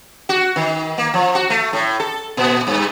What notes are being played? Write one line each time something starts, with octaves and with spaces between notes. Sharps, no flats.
F#4
D#3
A#3
F3
F#4
A3
A2
A4
A#2
G2